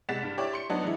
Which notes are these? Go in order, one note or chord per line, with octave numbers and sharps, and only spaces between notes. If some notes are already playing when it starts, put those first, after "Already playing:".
C2 G#3 F#5 A6 B6 E7
G2
E4 G4 C#5 D5
C6 C#7
F#3 B3 D4 D#4
E3 G#3 E4